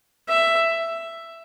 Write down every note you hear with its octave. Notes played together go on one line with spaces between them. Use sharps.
E5